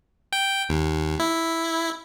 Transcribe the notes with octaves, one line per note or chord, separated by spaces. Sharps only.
G5
D#2
E4